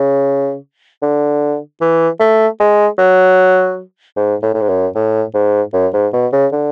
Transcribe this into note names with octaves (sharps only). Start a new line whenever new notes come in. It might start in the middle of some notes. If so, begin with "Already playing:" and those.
Already playing: C#3
D3
E3
A3
G#3
F#3
G#2
A2
A2
G#2
F#2
A2
G#2
F#2
G#2
B2
C#3
D3